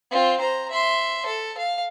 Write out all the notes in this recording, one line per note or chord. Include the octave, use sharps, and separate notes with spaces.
C4 F4
C5 A#5
E5 C6
A4
F5